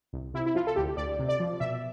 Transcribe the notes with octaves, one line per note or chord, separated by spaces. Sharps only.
C2
C3 E4
E4
F3 F4
A4
D2 G4
D2 D5
C3
D5
F3
B2 E5